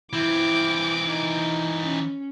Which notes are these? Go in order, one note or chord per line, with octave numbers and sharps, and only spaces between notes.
E3 C4 E4 D6
D#4
C#4